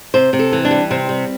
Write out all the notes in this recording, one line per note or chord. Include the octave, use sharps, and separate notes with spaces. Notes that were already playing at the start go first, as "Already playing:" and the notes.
C3 C5
C3
A4
E3
D4
G3
C3 C4
G3